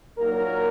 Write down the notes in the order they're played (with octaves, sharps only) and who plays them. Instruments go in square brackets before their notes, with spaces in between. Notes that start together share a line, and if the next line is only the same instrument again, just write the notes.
[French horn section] A#2 F#3 A#3 D#4 A#4